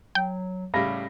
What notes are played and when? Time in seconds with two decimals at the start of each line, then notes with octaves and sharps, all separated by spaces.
0.15 F#3 G5
0.74 A2 C#3 G3 G4 F5 B5 A#6